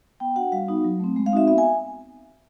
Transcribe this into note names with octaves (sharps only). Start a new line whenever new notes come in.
B3 G5
D4 F#4 F#5
G3 F5
B3 D#4 F#4
F#3
A3 C4
G#3
F5
C4 D#4 F#4 E5
B3 E5
G#5